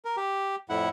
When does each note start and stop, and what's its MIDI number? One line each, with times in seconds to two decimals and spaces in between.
0.05 0.16 70
0.17 0.56 67
0.70 0.89 41
0.70 0.89 45
0.70 0.89 64
0.70 0.89 78